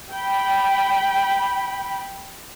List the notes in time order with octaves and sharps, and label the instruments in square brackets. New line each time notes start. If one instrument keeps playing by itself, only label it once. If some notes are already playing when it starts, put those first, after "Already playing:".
[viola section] G5 B5